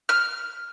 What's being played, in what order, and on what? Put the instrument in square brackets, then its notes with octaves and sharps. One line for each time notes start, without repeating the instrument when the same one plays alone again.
[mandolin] F6